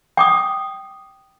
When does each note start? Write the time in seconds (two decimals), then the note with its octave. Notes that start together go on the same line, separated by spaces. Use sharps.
0.17 G5 D6 D#6